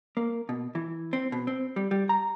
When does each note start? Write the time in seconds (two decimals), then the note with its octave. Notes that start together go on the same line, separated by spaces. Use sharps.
0.17 A#3
0.49 B2
0.75 E3
1.13 C4
1.32 B2
1.47 C4
1.76 G3
1.91 G3
2.09 A#5